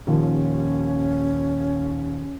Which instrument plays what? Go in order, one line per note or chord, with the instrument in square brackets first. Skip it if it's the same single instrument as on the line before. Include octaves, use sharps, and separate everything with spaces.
[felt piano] D#1 D#2 F3 [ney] C#4